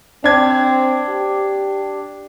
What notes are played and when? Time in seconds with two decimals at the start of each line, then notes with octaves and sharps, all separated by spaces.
0.24 C4 D4 G#6
1.09 G4